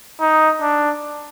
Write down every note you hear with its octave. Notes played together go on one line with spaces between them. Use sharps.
D#4
D4